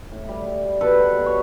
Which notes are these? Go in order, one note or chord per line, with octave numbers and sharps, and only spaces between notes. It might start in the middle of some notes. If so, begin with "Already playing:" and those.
A2
G3
G3
G3
B2 A4 B4
B2
B2
C#5